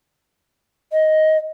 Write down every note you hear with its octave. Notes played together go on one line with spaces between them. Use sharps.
D#5